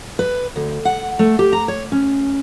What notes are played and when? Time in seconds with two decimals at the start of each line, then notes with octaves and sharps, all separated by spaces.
0.19 B4
0.56 D2
0.85 F#5
1.19 A3
1.39 G4
1.53 A#5
1.68 C#5
1.92 C#4